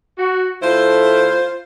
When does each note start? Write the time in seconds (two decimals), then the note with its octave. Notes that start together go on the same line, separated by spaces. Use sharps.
0.18 F#4
0.62 D3 A3 E4 F4 C5